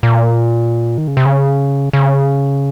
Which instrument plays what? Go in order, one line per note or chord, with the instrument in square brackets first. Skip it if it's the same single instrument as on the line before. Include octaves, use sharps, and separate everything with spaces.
[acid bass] A#2
D#3
C#3
C3
C#3
C#3